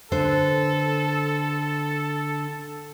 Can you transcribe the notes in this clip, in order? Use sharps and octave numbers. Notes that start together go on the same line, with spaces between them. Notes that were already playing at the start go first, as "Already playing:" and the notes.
D3 A4 B4 C5